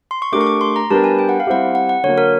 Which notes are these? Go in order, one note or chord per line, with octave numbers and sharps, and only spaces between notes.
C6
C#6
A3 D4 G4 A#4 D6
C#6
D6
C6
A#5
G3 B3 D4 G4 A#4 A5
G#5
G5
F#5
F5
G3 C4 E4 G4 F#5
F#5
F#5
D3 F#3 A#3 C#5
A#4